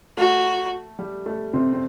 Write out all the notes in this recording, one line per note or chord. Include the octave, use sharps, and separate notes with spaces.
A3 F#4
G3
A3
C3 C4
C4